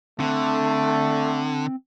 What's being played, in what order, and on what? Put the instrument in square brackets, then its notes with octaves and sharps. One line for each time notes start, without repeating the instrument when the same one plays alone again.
[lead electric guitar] D3 [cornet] A3 [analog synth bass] C4